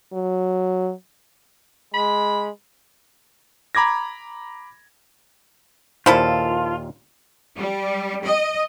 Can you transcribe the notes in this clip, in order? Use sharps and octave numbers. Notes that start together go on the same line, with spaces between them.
F#3
G#3 B5
A#5 B5 D6 G#6 A#6
D#2 A#2 F3 E4 F4 A4
G3
D#5